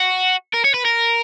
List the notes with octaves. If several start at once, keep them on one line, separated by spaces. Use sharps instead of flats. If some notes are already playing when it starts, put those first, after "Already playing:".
Already playing: F#4
A#4
C#5
B4
A#4